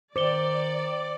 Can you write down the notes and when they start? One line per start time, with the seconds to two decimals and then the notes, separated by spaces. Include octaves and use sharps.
0.16 D#3 C5 D5 D6 C#7 G7